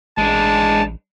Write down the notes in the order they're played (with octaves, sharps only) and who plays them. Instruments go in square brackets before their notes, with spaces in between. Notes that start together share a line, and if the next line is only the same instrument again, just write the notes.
[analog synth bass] A1 [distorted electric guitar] G#3 D4 [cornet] A5